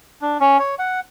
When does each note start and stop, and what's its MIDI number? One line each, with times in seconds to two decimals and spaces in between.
0.22 0.38 62
0.41 0.58 61
0.59 0.75 73
0.79 1.00 78